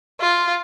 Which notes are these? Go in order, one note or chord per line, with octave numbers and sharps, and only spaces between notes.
F4